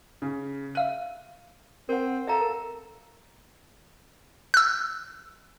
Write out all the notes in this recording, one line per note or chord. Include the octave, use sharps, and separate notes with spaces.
C#3
E5 F5 F#6 D#7
C4 A#4 F#5
A4 E5 F5 A#5
A#4
E6 F#6